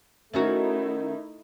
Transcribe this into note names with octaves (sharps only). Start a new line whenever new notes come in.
D#3 A3 C#4 D#4 E4 F#4 A#4 E5